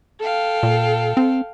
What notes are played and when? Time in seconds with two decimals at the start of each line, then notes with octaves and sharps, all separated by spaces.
0.20 A4 F5 G5
0.63 A#2
1.17 C4